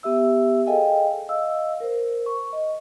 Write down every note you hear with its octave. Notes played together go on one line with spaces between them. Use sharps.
B3 G4 E5 E6
G#4 A4 D#5 F5 G5 G#5
D#5 F5 E6
A#4 C5
C#6
D#5